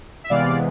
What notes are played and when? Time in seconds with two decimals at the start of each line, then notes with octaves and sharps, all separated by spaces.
0.24 E5
0.30 C3 E3 G#3 B3 D5 F5